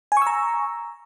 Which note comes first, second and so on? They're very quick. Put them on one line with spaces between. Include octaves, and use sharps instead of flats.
G#5 C#6 E6 A#5